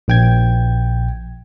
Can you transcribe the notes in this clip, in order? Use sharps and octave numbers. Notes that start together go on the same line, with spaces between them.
A#1 G5 G#6